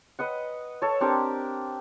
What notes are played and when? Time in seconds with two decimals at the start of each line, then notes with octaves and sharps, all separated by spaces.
0.19 B4 D#5 F#5
0.82 A4 C#5
1.00 C4 D4 G4 A#4